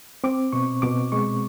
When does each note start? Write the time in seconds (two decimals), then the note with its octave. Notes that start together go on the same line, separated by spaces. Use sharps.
0.24 C4 D6
0.53 B2 C#6
0.82 B2 D6
1.12 G#3 C#6